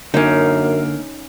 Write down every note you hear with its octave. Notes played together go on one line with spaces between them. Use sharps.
F#2 D3 A#3 C#4 D#4